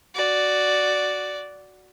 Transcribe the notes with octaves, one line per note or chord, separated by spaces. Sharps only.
F#4 D5